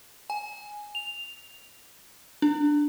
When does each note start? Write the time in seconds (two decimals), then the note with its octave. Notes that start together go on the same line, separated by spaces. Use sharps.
0.30 G#5
0.95 F7
2.42 D4